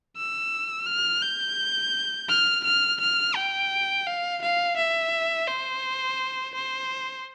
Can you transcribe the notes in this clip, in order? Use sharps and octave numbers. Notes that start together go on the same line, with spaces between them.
E6
F6
G6
F6
F6
F6
G5
F5
F5
E5
C5
C5